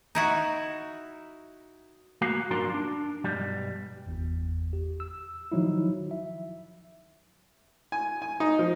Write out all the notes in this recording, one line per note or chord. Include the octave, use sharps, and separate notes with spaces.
D#4 E4 F#4
A#3 F#4 F5
G2 F#3 D4 F4 A#4 C6
D4
B1 G2 G3
G1 E2
G4
E6
D#3 F3 F#3 D#4 E4
E5
G#5
G#5
D#4
F3